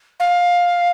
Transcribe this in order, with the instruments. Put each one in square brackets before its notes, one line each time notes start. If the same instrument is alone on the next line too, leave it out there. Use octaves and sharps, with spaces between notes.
[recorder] F5